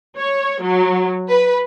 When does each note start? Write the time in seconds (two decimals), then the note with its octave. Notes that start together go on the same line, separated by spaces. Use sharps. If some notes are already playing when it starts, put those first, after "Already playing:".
0.18 C#5
0.63 F#3
1.29 B4